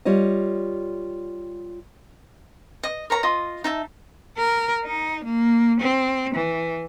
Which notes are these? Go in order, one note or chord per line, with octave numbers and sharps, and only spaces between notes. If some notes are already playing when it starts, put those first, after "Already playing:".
G3 F4 C#5 D#5
D#5
A#4 C#5 A#5
F4 D#5 D#6
D#4 E5 A5
A#4
D#4
A#3
C4
E3